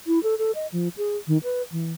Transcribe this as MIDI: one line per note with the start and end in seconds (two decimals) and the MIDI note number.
0.07 0.22 64
0.23 0.38 69
0.38 0.51 69
0.55 0.67 75
0.72 0.89 53
0.97 1.17 68
1.27 1.38 51
1.44 1.62 71
1.72 1.93 52